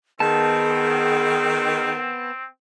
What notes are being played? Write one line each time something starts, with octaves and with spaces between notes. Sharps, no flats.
D#3 B3 C4 G#4 A5